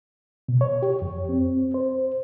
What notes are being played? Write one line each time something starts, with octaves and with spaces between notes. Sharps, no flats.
B2
C#5
G4
F2
C4
C5